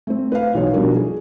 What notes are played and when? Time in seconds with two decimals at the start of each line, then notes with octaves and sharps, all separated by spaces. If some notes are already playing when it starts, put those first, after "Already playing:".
0.07 A3 C4
0.32 B4 F5
0.54 B1 E3 D#4 F4 C#5
0.73 B2 F3 G3 D4 A#4
0.95 G#4